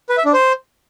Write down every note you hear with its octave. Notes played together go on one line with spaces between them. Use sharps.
B4
E5
D4
C5